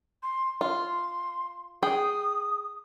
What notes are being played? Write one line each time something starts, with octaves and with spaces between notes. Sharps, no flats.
C6
F4 C6
G#4 G5 D#6